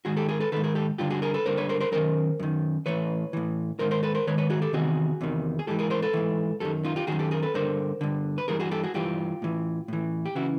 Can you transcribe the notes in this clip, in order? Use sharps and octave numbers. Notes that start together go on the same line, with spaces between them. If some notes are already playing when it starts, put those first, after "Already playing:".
G#2 D#3 F#4 G#4
G4 A4
G#4 A#4
A4 B4
G#2 D#3 A4 B4
G#4 A#4
G4 A4
G2 D3 F4 G4
F#4 G#4
G#4 A#4
A4 B4
G2 D3 A#4 C5
B4 C#5
A#4 C5
A#4 C5
F#2 D#3 A#4 C5
F#2 D#3
A2 E3 B4 C#5
A2 E3
G#2 D#3 A#4 C5
A#4 C5
A4 B4
A#4 C5
G#2 D#3 B4 C#5
B4 C#5
F#4 G#4
G4 A4
E2 C3 D#3 F#4 G#4
E2 C3 D#3
G#4
G#2 E3 G4 A4
G#4 A#4
A#4 C5
A4 B4
G#2 E3
F#2 D#3 G4 A4
D#4 F4
F4 G4
F#2 D#3 F#4 G#4
G4 A4
G#4 A#4
A4 B4
G2 D3 A#4 C5
G2 D3
B4
G2 E3 G#4 A#4
F#4 G#4
G4 A4
F#4 G#4
G2 E3 F4 G4
A2 E3
A2 E3
G4
C#3 E3 E4 F#4